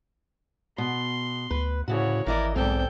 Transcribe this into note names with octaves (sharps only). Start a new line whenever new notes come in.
B2 C6
D2 B4
D2 A2 C#3 E4 F#4 C#5
G#1 E3 E4 A#4 D5 D#5
B1 E2 G#2 C4 A4 G5